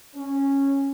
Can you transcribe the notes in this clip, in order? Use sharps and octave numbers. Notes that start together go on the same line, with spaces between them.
C#4